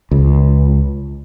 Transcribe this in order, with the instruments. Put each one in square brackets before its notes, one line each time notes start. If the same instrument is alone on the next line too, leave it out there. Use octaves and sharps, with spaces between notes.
[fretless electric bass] C#2